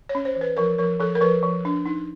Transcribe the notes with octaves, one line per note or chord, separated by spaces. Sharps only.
C#5
C#4
C5
E3
B4
F3 A#4
F3 A#4
F3 A4
A#4
F3 B4
F3
D4
D#4